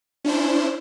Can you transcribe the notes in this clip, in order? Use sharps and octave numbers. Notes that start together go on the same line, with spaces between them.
C#4 D4 E4 C5